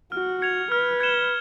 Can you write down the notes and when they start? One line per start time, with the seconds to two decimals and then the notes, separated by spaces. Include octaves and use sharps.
0.12 F#4 F6
0.42 G#6 C#7 F7
0.72 B4 F6
1.00 G#6 C#7 E7 G7